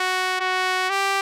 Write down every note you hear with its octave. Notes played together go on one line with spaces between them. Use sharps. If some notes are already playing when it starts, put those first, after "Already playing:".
Already playing: F#4
F#4
G4